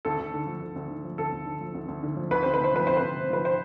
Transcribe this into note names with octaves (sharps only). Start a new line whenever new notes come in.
D2 A4
D2
D3
F3
D2
D2
D3
F3
D2 A4
D2
D3
F3
D2
D2
D3
F3
D2 B4
D2 C5
B4
C3 C5
F3 B4
D2 C5
B4
D2
C3
F3 B4
C5